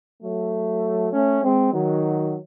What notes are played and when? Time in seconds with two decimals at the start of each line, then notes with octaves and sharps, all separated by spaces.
0.22 F#3 A3
1.12 A3 C#4
1.43 G#3 C4
1.73 D#3 F#3